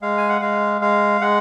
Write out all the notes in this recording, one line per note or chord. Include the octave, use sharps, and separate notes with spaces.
G#3 F5
G#5
F#5
G#3 F5
G#3 F5
G#3 F#5